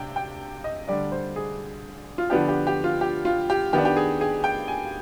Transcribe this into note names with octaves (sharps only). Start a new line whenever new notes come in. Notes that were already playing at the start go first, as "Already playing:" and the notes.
Already playing: C3 D4 G5
G5
D#5
D3 G3 D4 D5
C5
G#4
F4
D3 F3 B3 D4 G4
G4
G4
F4
G4
F4
G4
D#3 B3 D4 G4
G4
G#4
G#4
G5
G#5